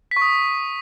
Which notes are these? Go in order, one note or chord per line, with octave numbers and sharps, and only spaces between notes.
B6
C#6
D#6